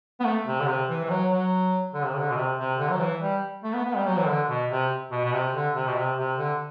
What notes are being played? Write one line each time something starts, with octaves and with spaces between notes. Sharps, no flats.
B3
A3
C3
D3
C3
E3
E3
F#3
F#3
D3
C3
D3
B2
C3
C3
D3
F#3
E3
G3
A3
B3
B3
G3
F#3
E3
D3
B2
C3
B2
B2
C3
D3
C3
B2
C3
C3
D3